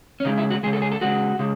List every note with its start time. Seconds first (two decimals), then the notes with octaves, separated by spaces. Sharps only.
0.20 C#4
0.25 C#3 G#3 D#4
0.38 E4
0.50 F#4
0.63 G#3 G#4
0.66 C#3
0.73 A4
0.82 G#4
0.92 A4
1.01 C#3 G#3 F#4
1.39 C#3 G#3